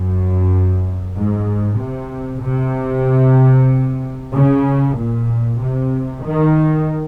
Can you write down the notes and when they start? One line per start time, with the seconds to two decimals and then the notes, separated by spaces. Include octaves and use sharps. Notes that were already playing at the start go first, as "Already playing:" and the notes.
Already playing: F#2
1.14 G#2
1.78 C3
2.42 C3
4.33 C#3
4.97 A#2
5.60 C3
6.24 D#3